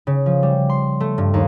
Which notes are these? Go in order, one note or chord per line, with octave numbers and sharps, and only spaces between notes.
C#3
F3
G3
C6
A3
G2
D#2